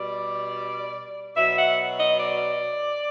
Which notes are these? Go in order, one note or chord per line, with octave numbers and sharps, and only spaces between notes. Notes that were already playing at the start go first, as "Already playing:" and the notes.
Already playing: B2 G3 D5
B2 F#3 E5
F#5
D#5
D5